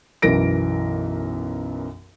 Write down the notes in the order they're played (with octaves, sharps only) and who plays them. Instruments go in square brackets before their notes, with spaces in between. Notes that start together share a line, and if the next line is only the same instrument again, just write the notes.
[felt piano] B1 F#2 E3 A#4 A#6 D7